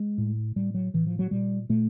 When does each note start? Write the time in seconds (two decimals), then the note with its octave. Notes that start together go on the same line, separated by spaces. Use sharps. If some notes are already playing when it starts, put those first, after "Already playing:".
Already playing: G#3
0.18 A2
0.56 A2 G3
0.74 F#3
0.94 A2 E3
1.07 F3
1.19 F#3
1.31 A#2 G3
1.69 A#2 A3